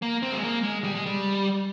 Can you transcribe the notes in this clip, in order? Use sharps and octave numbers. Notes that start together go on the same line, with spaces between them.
A#3
C4
G#3
A#3
G#3
G3
G#3
G3